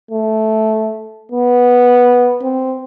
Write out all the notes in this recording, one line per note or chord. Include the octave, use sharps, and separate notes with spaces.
A3
B3
C4